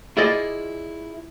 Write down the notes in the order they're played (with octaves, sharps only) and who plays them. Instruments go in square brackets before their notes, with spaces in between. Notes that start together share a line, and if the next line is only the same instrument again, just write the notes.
[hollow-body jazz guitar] E4 F4 G#4 D5 D#5